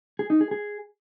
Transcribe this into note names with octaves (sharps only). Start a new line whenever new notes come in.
G#4
D#4
G#4
G#4